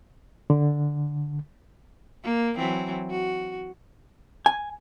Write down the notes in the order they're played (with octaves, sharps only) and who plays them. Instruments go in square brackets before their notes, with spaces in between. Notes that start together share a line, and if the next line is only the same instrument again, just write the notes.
[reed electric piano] D3
[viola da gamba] A#3
E3 F#3 C4
F#4
[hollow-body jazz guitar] G#5